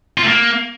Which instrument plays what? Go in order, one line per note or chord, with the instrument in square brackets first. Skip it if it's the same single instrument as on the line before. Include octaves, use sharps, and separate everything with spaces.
[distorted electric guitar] F4
A3
A#3